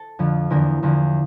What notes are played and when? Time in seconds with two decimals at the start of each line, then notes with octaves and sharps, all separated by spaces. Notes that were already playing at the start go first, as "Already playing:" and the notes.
Already playing: A4
0.19 F2 D3 F3
0.50 E2 D3 F3 A#3 A#4
0.83 E2 D3 F3